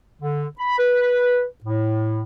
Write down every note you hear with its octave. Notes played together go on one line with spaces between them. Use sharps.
D3
B5
B4
A2